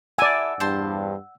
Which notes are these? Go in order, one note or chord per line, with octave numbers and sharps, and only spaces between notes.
E4 A4 D5 E5 F#5 G#5 E6
E2 G2 C5 A5 C6